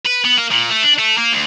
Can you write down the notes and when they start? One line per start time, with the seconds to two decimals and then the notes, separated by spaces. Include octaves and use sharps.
0.05 B4
0.25 B3
0.38 A#3
0.51 A#2
0.70 A3
0.83 D4
0.99 A3
1.18 A#3
1.33 D2